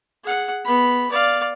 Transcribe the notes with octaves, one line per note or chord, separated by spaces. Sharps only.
G#4 F#5
B3 B5
D5 F5